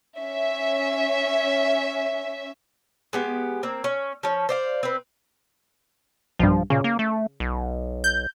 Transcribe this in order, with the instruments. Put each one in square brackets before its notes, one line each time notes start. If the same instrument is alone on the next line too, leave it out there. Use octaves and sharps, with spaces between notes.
[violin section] C#4 E5
[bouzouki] G#3 B3 G4
A#3 C4
C#4
F3 C#4
C5 D5 F5
C4 B4
[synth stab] B1 G2 [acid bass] F3
[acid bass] A#2 [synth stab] C#3
[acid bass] A#3
A3
B1
[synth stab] G6